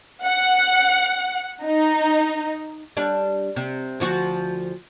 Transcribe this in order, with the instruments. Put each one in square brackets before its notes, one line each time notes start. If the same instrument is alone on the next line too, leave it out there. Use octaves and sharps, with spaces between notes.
[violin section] F#5
D#4
[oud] G3 D4
C3
D2 F3 F#4